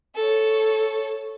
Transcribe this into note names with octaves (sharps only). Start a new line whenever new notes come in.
A4 C#5